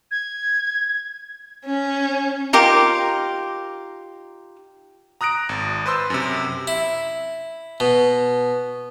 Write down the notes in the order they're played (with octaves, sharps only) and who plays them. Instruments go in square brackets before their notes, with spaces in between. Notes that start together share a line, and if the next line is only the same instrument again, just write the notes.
[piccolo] G#6
[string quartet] C#4
[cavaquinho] D#4 F4 G4 A#4
[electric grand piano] A#5 D#6 F#6 A#6 D7
G#1
B4 C5 C6 E6
F#2 C3
[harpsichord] E4
B2